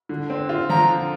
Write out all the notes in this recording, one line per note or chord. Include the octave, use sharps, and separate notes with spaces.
D3
C4
F4
F3 A#5
D3